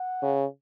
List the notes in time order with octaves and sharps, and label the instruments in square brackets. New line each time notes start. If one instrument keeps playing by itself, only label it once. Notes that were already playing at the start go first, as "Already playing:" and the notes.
Already playing: [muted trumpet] F#5
[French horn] C#3